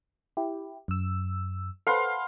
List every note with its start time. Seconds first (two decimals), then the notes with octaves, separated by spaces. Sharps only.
0.37 E4 G4
0.88 F#2 E6
1.87 A4 B4 C5 F5 F#5 C6